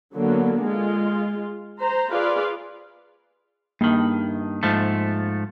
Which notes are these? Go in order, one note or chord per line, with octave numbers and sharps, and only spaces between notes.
D3 F#3 A#3 B3
G#3 F4
C5 A#5
F4 G#4 B4 D5 F5
G2 D#3 A#3
G#2 F3 A3